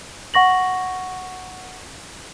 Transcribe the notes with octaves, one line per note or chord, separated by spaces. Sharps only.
F#5 C#6 A#6 F#7